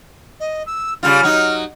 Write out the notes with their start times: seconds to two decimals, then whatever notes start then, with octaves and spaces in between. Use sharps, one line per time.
0.40 D#5
0.66 E6
1.03 C#3 G3 F4 F6
1.23 F#3 D#4